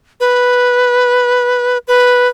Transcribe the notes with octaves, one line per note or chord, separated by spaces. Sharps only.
B4
B4